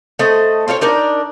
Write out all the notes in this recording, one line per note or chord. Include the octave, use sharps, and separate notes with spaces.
A3 C5 D#5
C4 F4 A4 C#5
D4 D#4 A#4 D5